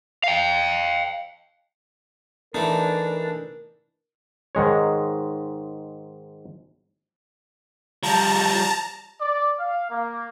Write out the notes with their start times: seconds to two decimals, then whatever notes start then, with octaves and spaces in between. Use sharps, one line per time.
0.24 F5 G5
2.54 E3 A3 D4 D#4 A#4
4.55 G#2 D#3 G#3 C#5
8.03 F3 G3 A5 A#5
9.21 D5
9.59 F5
9.90 A#3